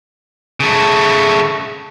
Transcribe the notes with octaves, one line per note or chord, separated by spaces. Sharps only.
C#3 A3